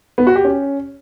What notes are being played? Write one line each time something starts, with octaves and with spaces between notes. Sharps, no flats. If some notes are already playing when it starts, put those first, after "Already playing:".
B3
F#4
G4
C#4